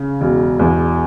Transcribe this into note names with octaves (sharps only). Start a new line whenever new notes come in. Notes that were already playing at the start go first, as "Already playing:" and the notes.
Already playing: C#3
E1
E2